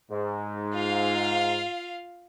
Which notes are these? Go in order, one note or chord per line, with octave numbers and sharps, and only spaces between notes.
G#2
F4 F5